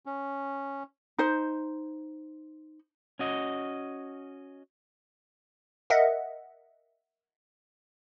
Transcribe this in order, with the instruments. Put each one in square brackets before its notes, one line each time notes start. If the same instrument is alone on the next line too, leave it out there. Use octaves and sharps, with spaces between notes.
[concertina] C#4
[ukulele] D#4 C5
[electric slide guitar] C#4 F#4 D#5
[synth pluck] A#4 D#5 E5 F#5